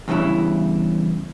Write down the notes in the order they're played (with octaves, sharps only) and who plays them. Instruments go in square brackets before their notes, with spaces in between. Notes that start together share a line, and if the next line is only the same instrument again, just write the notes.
[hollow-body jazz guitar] E2 G2 C#3 E3 E4